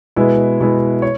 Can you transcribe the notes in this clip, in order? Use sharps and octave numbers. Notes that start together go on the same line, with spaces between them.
B2 G#3 B3 E4 B4
B2 G#3 B3 E4
C#5